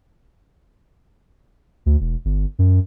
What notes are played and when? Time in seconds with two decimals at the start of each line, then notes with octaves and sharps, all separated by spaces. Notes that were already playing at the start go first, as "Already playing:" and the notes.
1.86 D2
2.01 E1
2.25 G1
2.59 F#2